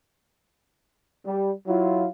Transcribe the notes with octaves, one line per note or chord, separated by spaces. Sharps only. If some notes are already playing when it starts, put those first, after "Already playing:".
G3
F#3 E4 F4